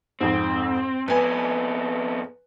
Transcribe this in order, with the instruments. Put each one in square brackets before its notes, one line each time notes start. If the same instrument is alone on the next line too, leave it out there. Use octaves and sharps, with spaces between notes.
[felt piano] F2 G#2 [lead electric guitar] C4
[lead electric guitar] F2 B3 [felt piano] B4 G#5